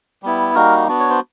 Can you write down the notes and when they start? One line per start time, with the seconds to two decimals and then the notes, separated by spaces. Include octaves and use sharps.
0.23 G3 B3 E4
0.55 G3 A#3 D#4 F#4 A#4
0.88 B3 D4 F#4
1.00 C#5
1.10 C5